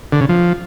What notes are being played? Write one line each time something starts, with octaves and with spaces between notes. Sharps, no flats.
D3
C#3
F3